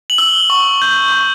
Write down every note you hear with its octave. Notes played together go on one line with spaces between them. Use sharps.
F#7
E6 G7
C#6
G6
C#6